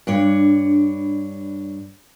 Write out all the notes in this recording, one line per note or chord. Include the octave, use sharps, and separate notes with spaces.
G2 D4 C#5